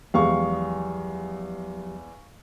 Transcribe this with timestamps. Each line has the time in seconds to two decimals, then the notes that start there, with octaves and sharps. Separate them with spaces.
0.14 E2 F3 F#3 G#3 G4 F5 C#6